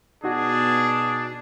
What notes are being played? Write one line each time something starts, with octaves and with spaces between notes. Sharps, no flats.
B2 D4 D#4 F#4 G#4